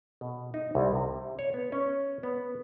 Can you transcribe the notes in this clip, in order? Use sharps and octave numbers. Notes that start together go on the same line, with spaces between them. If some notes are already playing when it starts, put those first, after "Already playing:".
B2
D#4
C2
C3
C#5
B3
C#4
B3